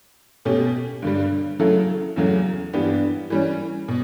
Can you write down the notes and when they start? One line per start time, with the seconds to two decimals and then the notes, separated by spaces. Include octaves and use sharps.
0.45 B2 A3 C#4 G4
1.02 G2 D3 G3
1.59 C#3 F#3 A3 E4 A4
2.16 E2 C#3 F#3 A3
2.73 G2 E3 B3 D4 G4
3.30 E3 G3 C#4
3.88 B2